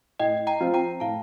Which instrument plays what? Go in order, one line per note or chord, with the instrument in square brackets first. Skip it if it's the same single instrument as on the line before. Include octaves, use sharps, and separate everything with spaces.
[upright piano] A2 [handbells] D#5 G5
[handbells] G5 A#5
[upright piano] F3 C4 F4
[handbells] G5 A#5
[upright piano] A2 [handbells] F5 A5